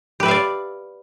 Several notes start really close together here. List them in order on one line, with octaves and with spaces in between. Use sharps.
G4 B4 E5 F5 D5